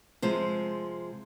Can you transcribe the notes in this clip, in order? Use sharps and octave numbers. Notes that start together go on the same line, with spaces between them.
C3 F3 G#3 C5